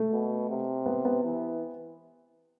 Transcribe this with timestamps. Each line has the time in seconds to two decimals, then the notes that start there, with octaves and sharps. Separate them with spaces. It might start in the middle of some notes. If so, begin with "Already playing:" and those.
Already playing: A3
0.12 B2
0.49 C3
0.86 B3
1.05 B3
1.24 E3